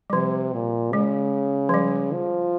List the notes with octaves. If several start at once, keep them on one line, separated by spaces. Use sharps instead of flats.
G3
C3 F3
A#2
C#3 G#3
F3
G3
F3